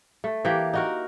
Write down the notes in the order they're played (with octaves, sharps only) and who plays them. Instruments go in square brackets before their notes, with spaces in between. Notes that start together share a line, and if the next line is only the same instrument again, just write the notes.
[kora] A3
E3 A#3 G4
D#4 F#4 A#4